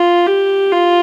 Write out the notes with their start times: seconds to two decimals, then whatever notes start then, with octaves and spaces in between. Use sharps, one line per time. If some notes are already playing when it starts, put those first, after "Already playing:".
Already playing: F4
0.27 G4
0.72 F4